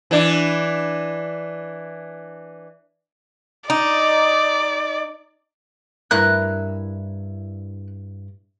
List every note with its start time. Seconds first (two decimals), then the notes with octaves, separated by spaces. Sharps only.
0.11 E3 D4
3.70 D#4 D5
6.11 G2 E4 A#4 F#6